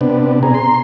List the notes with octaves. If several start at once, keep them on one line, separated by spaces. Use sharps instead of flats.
C3 B3 D4
B2 C4 G#4 A#5
C6